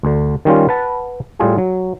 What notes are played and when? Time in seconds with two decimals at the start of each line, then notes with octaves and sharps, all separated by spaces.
0.03 D2 D3
0.45 D#3 G3 C#4 F4
0.69 B4 F#5 A5
1.39 A2 G3 F4 G#4
1.58 F#3